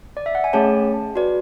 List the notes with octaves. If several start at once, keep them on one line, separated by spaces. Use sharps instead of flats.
D5
E5
F#5
G#5
A3 C#4 G#4 C#5 A5
F#4 B4 D5